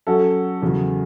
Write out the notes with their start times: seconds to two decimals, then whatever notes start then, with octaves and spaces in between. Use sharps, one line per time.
0.07 F#3 C#4 F#4 A4
0.62 E2 C#3 F#3